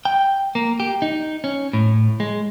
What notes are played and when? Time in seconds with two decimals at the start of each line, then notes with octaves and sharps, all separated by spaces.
0.05 G5
0.55 A#3
0.80 G4
1.02 D#4
1.44 C#4
1.73 A2
2.20 G#3